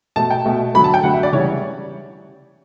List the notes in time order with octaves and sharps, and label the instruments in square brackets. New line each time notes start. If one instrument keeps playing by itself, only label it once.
[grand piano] B2 A3 A5
G5
B2 A3
D3 F#3 A3 B5
A5
G5
D3 F#3 A3 F#5
E5
D5
C#3 E3 G3 C#5